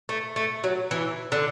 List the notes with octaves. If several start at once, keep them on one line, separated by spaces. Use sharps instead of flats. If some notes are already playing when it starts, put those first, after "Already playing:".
A3
A3
F#3
E3
D3